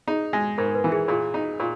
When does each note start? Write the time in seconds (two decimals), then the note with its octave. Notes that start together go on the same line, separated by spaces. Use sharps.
0.08 D#4 G#4
0.33 G#3
0.58 G#2 A#4
0.75 B4
0.84 E3
0.92 G#4
1.08 A#2 G#4
1.34 D#4
1.60 A#2